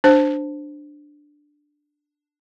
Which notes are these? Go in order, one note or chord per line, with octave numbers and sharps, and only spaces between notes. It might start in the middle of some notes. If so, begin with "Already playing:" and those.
D4 C5